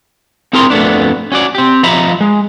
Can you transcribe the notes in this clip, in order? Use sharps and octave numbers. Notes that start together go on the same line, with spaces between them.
C4 E4 G#4 A#4 A#5 C6
F2 A3 B3 D4
C#4 F#4 D5
C4 G4
F3 D#5 E5 A#5 B5
G#3